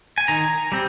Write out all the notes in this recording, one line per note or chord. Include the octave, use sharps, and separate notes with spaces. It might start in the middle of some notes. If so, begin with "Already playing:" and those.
G#5
D#3 A#5
G3 C4